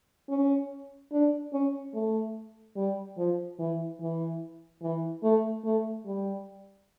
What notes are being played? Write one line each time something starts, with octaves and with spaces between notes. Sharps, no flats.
C#4
D4
C#4
A3
G3
F3
E3
E3
E3
A3
A3
G3